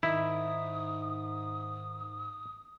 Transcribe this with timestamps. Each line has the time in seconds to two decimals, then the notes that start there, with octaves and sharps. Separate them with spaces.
0.03 G#2 D#3 E4 D#6